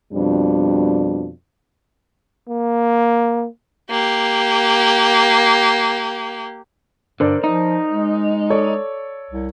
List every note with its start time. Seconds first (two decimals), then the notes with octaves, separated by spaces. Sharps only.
0.12 F2 B2 G3 D4
2.48 A#3
3.90 A#3 G4
7.20 G2 D3 A#4 C5 D5
7.44 F3 D#4
7.88 G#3
8.50 A4 C#5 D5
9.31 C2